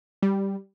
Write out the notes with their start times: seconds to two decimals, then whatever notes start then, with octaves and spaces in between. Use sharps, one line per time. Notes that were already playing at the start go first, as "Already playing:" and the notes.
0.23 G3